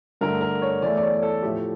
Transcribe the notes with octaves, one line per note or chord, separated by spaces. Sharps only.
G2 D3 A3 A#4
A#4
C#5
E2 E3 A3 D5
D5
C#5
A4
A2 F3 A3 G4